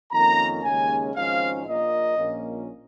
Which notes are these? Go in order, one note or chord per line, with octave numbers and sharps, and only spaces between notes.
F2 D#3 A#3 C#4 A#5
D#2 C#3 G#3 C#4 G#5
G#1 G#2 F3 C#4 F5
A#1 A#2 A#3 D#5
A#1 A#2 A#3 C#4